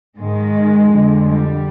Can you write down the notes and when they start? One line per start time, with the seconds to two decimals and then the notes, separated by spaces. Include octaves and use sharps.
0.19 G#2 D#3 G#3
0.91 F2 D3
1.26 G3